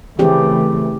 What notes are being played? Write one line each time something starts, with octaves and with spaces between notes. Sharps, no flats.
C#3 E3 A3 C4 G4 G#4